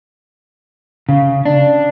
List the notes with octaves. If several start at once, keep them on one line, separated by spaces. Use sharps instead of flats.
C#3
D4